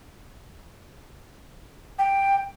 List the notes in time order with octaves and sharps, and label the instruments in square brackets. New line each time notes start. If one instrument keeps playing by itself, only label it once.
[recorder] G5